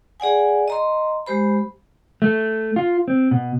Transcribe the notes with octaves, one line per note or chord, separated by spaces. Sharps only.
G#4 D5 F#5 G#5
D#5 A#5 C6
G#3 G4 C5 B5
A3
F4
C4
B2